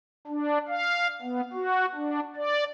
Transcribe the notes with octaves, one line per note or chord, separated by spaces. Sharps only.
D4
F5
B3
F#4
D4
D5